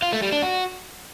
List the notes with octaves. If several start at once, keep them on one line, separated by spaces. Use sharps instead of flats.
F4
A3
G3
D4
F#4